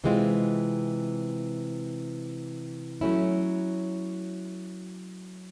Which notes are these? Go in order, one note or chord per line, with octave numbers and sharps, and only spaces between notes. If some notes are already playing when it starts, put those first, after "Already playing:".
C3 E3 G#3 C4 F4
F#3 A3 C#4 E4